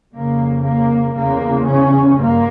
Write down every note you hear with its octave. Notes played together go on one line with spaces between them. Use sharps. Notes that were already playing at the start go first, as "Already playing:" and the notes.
F2 C#3 A#3
A#3
E2 C#3 A#3
C#4
G2 A#3